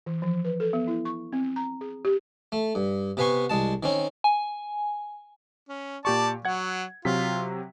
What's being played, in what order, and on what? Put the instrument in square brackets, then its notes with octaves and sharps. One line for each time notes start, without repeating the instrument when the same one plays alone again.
[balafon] E3
F3
B4
A4
B3
E4
C#6
C4
A#5
G#4
G4
[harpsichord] A3
G2
C3 B3 B4 G#5 C6 C#6
C2 G#3 A5
D#3 C4 C#4
[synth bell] G#5
[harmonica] C#4
[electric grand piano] A#2 G4 C#6 [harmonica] D5 A5
[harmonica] F#3 [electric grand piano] F#5 G#6
[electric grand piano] C3 F#3 B6 [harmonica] F4